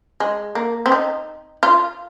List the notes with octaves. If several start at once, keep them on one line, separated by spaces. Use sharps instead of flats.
G#3
A#3
C4
D#4
F4